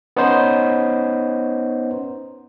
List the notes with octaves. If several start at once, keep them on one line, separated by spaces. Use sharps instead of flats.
B3 C#4 D#4 C5